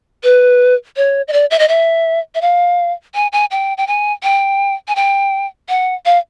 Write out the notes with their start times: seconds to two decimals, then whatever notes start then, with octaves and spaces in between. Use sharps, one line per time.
0.23 B4
0.96 C#5
1.28 D#5
1.33 D5
1.51 E5
1.59 D#5
1.69 E5
2.35 E5
2.41 F5
3.15 G#5
3.33 G#5
3.51 G5
3.78 G5
3.87 G#5
4.23 G5
4.88 G#5
4.96 G5
5.69 F#5
6.06 F5